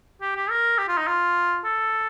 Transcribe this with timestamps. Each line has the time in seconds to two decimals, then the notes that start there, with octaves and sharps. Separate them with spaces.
0.21 G4
0.36 G4
0.50 A#4
0.78 G4
0.88 F4
0.98 D#4
1.07 F4
1.64 A4